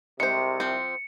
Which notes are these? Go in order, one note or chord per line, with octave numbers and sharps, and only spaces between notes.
C2 C3 G#3 C5 C#7
F3 C4